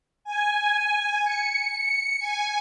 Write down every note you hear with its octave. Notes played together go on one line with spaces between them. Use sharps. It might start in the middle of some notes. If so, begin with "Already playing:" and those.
G#5
C#7
G#5